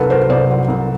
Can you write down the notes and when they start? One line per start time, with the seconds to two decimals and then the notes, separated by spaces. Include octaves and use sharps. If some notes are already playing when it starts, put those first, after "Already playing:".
Already playing: C2 F#3 A4 B4
0.10 F#3 A#4 C5
0.30 C2 C5 D5
0.50 F#3
0.68 C2